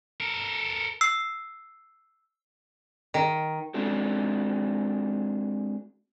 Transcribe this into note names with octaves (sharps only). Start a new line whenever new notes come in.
A4 A#4
E6 C7
D#3
G#3 C4 D4 F#4 A4